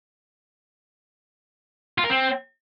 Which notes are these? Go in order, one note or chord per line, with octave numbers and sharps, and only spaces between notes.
F4
A#4
C4